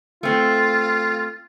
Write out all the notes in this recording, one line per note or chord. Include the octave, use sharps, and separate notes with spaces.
A3 C4 F4